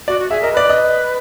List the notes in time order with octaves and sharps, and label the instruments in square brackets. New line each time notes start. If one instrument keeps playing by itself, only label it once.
[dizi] F#4 [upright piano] D5
[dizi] F#4
[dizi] G#4 [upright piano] E5
[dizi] A#4 [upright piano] D#5
[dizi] B4 [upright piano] D5
[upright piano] D#5